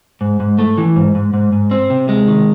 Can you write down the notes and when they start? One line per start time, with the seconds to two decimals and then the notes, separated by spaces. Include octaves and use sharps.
0.21 G#2
0.40 G#2
0.59 A3
0.78 E3
0.96 G#2
1.15 G#2
1.34 G#2
1.52 G#2
1.71 C4
1.90 C3
2.09 G#3
2.27 D#3